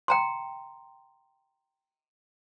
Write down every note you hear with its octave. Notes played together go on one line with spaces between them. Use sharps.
G5 A#5 C6